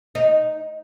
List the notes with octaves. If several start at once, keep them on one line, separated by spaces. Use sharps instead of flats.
D#4